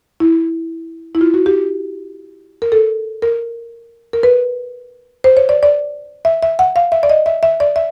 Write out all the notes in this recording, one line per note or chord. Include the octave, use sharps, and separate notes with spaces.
E4
E4
F4
F#4
G4
A#4
A4
A#4
A#4
B4
C5
C#5
D5
D5
E5
E5
F#5
F5
E5
D5
D#5
E5
E5
D5
E5